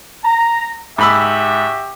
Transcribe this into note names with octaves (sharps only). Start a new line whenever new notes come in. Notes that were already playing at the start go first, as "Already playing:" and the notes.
A#5
G#2 F#4 G4 E5 B5 E6